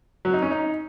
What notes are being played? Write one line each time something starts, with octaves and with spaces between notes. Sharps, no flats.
F#3
D#4
C#4
D#4